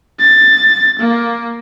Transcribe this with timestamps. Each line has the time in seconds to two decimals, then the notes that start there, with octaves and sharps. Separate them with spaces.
0.19 A6
0.99 A#3